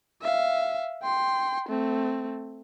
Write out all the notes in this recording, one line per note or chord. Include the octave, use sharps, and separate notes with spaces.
E5 F5
G5 C6
A3 C4